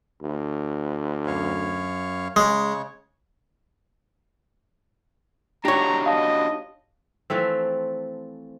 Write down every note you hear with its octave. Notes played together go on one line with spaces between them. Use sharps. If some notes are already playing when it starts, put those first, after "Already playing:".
D2
F#2 C#5 F5
C#3 G#3 C#5
D4 D#4 F#4 G4 C#5 A#5
D#5 F5 A5
E3 F3 A3 C4